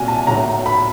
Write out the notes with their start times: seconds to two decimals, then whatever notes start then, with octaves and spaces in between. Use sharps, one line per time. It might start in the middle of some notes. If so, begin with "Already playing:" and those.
Already playing: C2 A#2 F#3 G#5
0.08 A5
0.27 B1 A2 F#3 A#5
0.66 B5